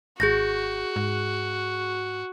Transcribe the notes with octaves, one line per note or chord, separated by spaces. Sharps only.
G#1 F#4 G#4 G6 A#6
G#2